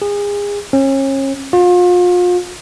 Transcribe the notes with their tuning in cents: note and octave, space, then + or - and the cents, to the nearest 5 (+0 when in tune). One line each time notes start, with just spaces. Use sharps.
G#4 -30
C#4 -35
F4 +35